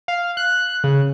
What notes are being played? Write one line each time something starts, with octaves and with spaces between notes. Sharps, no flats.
F5
F#6
C#3